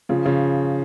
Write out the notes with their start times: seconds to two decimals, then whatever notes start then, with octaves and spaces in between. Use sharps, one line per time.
0.09 C#3 F3
0.25 C#3 F3